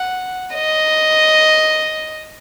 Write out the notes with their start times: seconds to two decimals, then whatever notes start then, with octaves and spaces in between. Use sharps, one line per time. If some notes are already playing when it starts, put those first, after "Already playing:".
Already playing: F#5
0.55 D#5